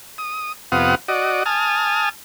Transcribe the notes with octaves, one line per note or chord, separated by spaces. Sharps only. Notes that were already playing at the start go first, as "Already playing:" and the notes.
D#6
F2 C3 B3 F5 F#5 D#6
F#4 D5 D#5
G#5 A5 D#6 F6